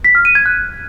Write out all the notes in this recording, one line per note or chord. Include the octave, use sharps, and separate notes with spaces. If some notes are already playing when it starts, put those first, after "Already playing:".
B6
F6
D#7
G#6
F#6